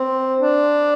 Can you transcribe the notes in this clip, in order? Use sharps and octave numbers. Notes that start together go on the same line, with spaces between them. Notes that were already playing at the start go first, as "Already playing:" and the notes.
Already playing: C4
D4